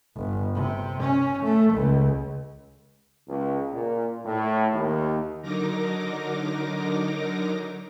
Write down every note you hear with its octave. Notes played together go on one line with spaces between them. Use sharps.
G1
C3
C#4
A3
C#2
C#2
A#2
A2
D#2
D3 F#3 D#4 A#4 D6 A#6